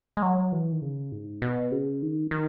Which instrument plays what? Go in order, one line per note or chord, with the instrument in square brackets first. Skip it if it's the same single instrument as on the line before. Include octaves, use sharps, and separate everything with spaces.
[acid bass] G#3
F#3
E3
D#3
C#3
G#2
B2
C#3
D#3
D#3